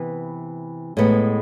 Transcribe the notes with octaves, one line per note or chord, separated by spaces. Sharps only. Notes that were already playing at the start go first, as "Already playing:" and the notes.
Already playing: C3 E3 B3 B4
A2 G#3 B3